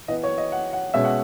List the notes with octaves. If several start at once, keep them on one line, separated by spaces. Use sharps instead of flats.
E3 B3 D#5
C#5
D#5
F#5
F#5
B2 G#3 C#4 E5
F#5